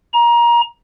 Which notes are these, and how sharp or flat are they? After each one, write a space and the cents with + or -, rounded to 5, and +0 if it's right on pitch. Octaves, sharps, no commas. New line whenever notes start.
A#5 +25